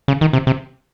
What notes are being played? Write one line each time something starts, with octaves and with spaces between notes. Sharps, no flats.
C#3
D#3
C3
C3